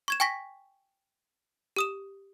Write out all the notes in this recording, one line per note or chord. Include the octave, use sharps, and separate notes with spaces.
C#6 G#6 E7
G5 G#5 C#6 A#6 B6
G4 D#6 E7